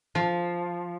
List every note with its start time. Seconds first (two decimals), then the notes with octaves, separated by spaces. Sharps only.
0.15 F3